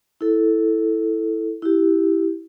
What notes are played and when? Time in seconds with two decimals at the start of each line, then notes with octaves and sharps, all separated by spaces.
0.21 E4 A4
1.62 E4 G4